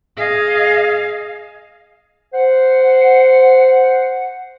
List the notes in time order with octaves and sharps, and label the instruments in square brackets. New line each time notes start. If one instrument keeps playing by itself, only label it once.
[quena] G#4 [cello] D#5 F5
[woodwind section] C5 F#5